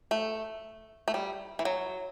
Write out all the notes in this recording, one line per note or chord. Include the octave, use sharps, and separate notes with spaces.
A3
A3
G3
E3
F#3